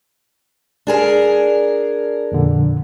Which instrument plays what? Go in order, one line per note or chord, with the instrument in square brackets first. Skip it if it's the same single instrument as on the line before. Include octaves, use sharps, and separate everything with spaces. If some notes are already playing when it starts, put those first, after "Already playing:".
[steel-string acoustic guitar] D4 G#4 A#4
[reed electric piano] F2 A#2 D3